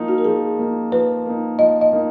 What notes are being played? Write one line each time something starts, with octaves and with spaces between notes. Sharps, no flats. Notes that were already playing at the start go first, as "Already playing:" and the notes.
Already playing: F3 A#3 D#4
F#4
A#4
F3 G#4
A#3 D#4
F3 B4
A#3 D#4
F3 D#5
D#5
A#3 D#4